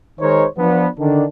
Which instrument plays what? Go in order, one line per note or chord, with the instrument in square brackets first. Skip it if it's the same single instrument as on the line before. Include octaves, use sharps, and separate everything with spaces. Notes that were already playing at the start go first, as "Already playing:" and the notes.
[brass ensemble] D#3 G#3 D#4 A#4 C5 C#5
F3 B3 D4
D3 D#3 D4